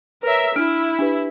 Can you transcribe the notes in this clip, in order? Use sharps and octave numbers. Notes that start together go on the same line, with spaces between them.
A#4 B4 C#5 E5
D4 E4 F6 D7
D4 G4 B4